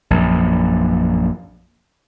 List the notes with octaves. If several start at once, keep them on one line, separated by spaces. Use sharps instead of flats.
A#1 F#2